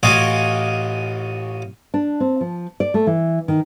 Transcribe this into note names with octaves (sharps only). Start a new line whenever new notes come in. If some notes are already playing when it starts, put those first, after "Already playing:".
A1 F4 F#4 D#5 G#5 D6
D4
C4
F3
D5
A3
E3
D#3